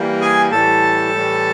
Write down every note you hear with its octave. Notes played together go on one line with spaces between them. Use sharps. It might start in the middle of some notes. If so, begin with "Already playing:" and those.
Already playing: E3 G3 A#3
G#4 G#5
A2 E3 G3 A4 A5
A2 E3 G3